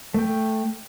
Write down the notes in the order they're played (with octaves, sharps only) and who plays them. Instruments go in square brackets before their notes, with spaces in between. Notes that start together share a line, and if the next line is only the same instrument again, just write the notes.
[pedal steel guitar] A3 G5